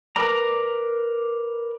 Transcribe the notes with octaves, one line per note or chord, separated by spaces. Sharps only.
A#4 B4 D5 A#5